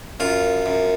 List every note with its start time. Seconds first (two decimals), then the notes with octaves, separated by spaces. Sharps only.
0.20 F#2 F4
0.66 F#2